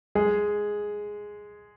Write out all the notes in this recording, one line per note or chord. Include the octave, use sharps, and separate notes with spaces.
G#3 G#4